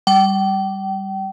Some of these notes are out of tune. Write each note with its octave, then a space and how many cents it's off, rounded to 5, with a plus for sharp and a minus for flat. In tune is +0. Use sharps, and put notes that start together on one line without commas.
G3 +0 G5 -35